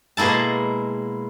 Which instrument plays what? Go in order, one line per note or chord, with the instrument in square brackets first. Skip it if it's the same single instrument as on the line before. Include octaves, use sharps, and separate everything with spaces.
[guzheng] B2 G#3 A#3 E4 A5